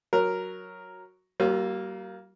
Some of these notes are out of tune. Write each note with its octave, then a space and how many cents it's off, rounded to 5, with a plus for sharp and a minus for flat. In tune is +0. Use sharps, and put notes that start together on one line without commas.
F#3 -5 A#4 +0
G3 -45 A#3 +0 F4 +5